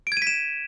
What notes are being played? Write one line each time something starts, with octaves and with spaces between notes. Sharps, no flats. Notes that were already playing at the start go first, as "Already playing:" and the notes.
D7
G#6
D#7
B6
E7